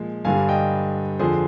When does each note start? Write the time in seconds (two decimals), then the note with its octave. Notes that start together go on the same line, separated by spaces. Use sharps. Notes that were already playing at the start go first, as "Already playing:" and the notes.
Already playing: A#2 F3 G#3
0.25 G2 D3 G3 F5 G#5
0.49 D#5 G5
1.19 F2 D3 F3 G#4 C5